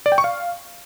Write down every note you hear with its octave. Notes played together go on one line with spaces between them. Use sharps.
D5
G5
C#6
F5